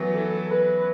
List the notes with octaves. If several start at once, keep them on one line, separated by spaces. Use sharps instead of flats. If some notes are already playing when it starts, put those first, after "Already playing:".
Already playing: E3 F#3 A3 B3
E3 A4
B4